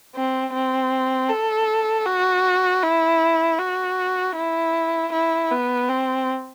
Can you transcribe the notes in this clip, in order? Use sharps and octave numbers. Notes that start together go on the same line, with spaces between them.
C4
C4
A4
F#4
E4
F#4
E4
E4
B3
C4